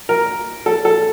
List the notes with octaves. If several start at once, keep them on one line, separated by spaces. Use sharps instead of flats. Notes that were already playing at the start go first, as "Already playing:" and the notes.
A#4
A4
A4